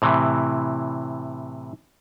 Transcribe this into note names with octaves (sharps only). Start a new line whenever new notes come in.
A2 C3 E3